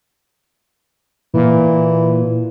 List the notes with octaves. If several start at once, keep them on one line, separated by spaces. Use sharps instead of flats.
A#2 E3